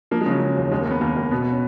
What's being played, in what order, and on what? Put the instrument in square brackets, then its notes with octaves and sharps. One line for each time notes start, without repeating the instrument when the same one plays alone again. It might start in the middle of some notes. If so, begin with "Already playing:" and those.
[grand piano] F3 A#3
G#3
C#3 F#3
C#3 G#3
D#2
D#2 G#3
A#3
D#2
B3
D#2 A#3
D#2 A#3
B2 B3
B3
C#4